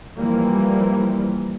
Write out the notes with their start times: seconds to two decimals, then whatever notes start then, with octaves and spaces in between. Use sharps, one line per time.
0.17 E3 F3 G3 A#3